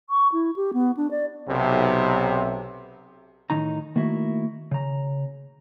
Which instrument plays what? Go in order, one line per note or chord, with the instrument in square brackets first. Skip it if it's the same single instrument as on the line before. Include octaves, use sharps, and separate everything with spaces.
[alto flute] C#6
E4
G4
B3
D4
D5
[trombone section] B1 C3
[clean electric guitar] A2 D#3 E3 D#4 A#5
D#3 A3 A#3 E4 F#4
C#3 A#5